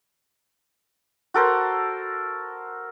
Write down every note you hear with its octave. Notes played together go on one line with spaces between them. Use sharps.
F#4 A4 A#4 C5